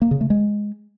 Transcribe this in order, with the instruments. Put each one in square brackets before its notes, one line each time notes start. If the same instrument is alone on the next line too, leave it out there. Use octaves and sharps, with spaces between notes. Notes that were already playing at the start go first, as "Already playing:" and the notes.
[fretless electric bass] A#3
C#3
A3
G#3